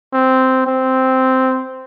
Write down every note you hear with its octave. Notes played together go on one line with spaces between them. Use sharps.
C4
C4